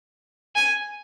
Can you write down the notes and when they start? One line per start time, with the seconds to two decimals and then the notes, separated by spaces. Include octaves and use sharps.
0.55 G#5